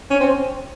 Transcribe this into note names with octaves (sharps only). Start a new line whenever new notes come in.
C#4
C4